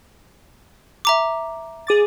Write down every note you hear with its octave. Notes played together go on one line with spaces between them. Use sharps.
E5 A#5 D6
G#4 D6 A6